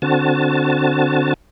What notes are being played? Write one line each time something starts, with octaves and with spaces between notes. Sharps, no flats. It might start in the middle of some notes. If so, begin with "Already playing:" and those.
D3 C4 F#4 A5